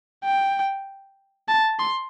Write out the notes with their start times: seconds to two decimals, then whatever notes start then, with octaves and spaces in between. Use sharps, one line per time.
0.24 G5
1.48 A5
1.79 C6